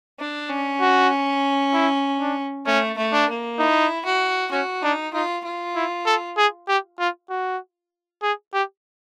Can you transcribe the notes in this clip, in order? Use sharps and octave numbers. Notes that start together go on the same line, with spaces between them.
D4
C#4
F#4
E4
D4
A3 C#4
A3
D4
A#3
D#4 E4
F#4
C#4 F#4
D4 D#4
D#4 F4
F4
E4
A4
G#4
G4
F4
F#4
G#4
G4